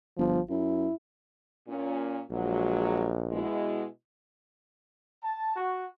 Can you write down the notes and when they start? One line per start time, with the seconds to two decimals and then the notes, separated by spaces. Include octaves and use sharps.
0.18 G1 F3
0.50 F#2 E4
1.68 A#2 C#4
2.31 A#1 F#3 G#3
3.31 B2 G#3 E4
5.23 A5
5.56 F#4